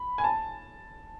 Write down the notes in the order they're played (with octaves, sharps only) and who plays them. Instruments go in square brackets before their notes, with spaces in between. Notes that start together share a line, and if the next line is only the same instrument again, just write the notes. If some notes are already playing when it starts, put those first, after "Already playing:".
Already playing: [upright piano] B5
G#5
A5